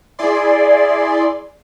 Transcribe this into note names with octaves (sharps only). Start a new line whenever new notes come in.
E4 G#4 D5 C6